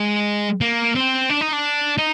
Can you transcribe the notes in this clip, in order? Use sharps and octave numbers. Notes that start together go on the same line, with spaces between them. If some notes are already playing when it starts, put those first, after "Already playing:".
Already playing: G#3
A#3
C4
D4
D#4
D4
D#4